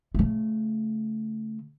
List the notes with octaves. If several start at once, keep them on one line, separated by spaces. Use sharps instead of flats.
C#3 A3